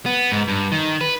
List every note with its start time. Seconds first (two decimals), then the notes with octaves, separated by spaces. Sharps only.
0.06 B3
0.32 G#2
0.48 G2
0.72 D#3
1.01 B4